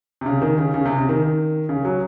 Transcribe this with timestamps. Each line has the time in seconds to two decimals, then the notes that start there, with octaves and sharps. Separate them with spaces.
0.21 C3
0.26 C#3
0.42 D#3
0.58 C#3
0.74 C#3
0.85 C3
0.97 C#3
1.09 D#3
1.69 C#3
1.85 F#3